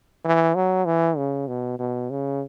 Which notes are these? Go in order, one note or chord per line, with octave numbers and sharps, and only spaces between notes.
E3
F#3
E3
C#3
B2
B2
C#3